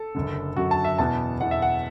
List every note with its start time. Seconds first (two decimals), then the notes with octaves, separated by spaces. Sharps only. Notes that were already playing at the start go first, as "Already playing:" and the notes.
Already playing: A4
0.15 F#1 F#2 D3
0.56 F#1 F#2 D3 F#4
0.71 A5
0.85 E5
0.98 E2 B2 B3 E4 A5
1.40 E2 B2 B3 E4 F#5
1.51 E5
1.62 F#5